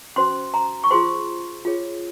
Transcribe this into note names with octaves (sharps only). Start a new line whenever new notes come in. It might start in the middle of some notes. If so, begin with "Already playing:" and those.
C#4 F#4 C5 C6
A#5
C#6
F4 G#4 C5 C6
F4 G#4 C#5